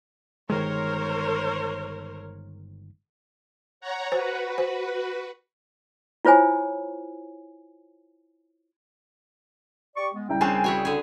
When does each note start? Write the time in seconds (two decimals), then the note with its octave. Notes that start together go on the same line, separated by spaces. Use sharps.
0.50 G1 D#3 G#3 A#4 C5 C#5
3.81 C#5 F#5 A#5
4.12 F#4 B4 C5
4.58 C5
6.25 E4 F4 C5 C#5 G#5
9.97 G4 D5 C#6
10.14 G#3 B3
10.29 C2 C#3 G3 E4 G5 A#5
10.41 C#3 C4 D4 G#5 A6 C7
10.64 E4 F#4 C#5 G#5 D#6
10.85 D3 G#4